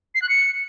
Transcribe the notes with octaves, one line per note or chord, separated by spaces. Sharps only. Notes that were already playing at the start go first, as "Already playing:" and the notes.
C7
F#6
C#7